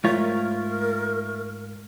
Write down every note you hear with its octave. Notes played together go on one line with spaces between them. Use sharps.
G#2 A3 F4 A#4 C#5